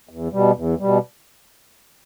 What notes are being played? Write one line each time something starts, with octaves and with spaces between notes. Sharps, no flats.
E2
B2 G3
E2
B2 G3